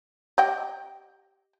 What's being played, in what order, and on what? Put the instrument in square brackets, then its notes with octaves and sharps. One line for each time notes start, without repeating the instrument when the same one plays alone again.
[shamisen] G4 D#5 G5